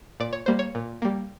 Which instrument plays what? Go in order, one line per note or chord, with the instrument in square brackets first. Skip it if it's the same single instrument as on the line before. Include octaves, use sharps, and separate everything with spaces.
[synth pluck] A#2 D5
C#5
G3 A#3 C5
C#5
A#2
G3 A#3